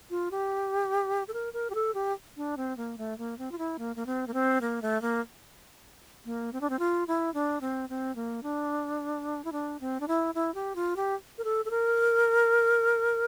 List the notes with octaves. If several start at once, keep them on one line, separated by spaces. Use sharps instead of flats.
F4
G4
A4
A#4
A#4
G4
A4
G4
D4
C4
A#3
A3
A#3
C4
F4
E4
A#3
A#3
C4
A#3
C4
A#3
A3
A#3
A#3
C4
D4
C4
F4
E4
D4
C4
C4
A#3
D4
E4
D4
C4
D4
E4
E4
G4
F4
G4
A#4
A4
A4
A#4